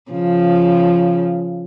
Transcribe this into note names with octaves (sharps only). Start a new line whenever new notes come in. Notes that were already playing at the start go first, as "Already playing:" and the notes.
C#3 F3